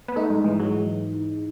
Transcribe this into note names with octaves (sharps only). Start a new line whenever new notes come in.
B3
A3 D#4
G#2 G#3
E3 G#3
F#3 G#3